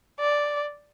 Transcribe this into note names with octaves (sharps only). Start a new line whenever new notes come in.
D5